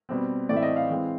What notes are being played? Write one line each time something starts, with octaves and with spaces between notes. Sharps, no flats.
B2 G3 C4
A2 E3 A3 C4 D5
E5
D#5
F5
E3 G#3 C4